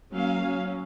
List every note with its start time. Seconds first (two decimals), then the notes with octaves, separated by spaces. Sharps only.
0.12 F#3 A#3 C#4 F5
0.43 F#3 C#4